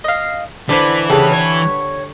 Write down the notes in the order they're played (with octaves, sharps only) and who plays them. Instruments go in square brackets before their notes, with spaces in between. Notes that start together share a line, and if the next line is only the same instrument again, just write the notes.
[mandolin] D#5 F5
[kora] D3 C5 F#5 [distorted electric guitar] E3 [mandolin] D5 B5
[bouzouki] C#3 [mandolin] F#4 B4 [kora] G4 A4 G5
[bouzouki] C#5